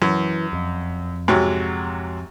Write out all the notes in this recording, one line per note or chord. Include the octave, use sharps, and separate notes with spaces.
F#2 E3
F2
G#2 C3 F#3